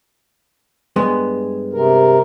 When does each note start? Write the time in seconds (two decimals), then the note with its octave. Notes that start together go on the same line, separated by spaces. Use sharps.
0.96 G2 G#3 B3
1.73 C3 A#4